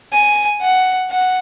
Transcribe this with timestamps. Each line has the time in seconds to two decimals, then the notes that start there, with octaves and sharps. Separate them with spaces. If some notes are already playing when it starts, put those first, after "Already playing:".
0.13 G#5
0.62 F#5
1.10 F#5